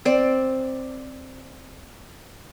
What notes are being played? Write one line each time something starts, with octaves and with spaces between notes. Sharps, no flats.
C4 D5